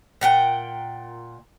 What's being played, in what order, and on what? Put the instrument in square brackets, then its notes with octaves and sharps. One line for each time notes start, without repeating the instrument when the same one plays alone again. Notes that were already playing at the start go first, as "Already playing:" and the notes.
[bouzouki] A#2 F#5 G5